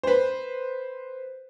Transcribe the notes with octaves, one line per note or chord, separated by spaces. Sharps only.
B4 C5